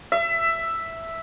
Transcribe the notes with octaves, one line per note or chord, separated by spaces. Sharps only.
E5